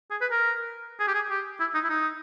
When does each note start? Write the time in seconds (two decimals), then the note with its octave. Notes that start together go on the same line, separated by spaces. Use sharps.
0.11 G#4
0.21 B4
0.31 A#4
1.00 G#4
1.08 G4
1.15 G#4
1.30 G4
1.60 E4
1.75 D#4
1.84 E4
1.90 D#4